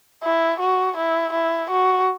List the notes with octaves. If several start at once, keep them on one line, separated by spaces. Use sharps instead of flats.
E4
F#4
E4
E4
F#4